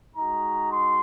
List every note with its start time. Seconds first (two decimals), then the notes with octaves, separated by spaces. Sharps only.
0.17 G#3 D#4 F#4 A#5
0.72 C6